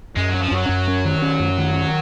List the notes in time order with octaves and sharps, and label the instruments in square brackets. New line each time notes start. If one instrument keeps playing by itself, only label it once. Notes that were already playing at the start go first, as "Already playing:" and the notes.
[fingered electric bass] F#2 [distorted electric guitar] G#3
[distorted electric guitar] F#3 [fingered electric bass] C#4
[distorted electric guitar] F3
[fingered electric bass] F#2 [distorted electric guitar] F#3
[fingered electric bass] F#2
C#4
D#3
C#4
F#2
D#3
C#4